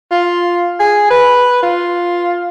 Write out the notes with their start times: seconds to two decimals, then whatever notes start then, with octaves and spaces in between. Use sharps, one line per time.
0.11 F4
0.80 G#4
1.10 B4
1.63 F4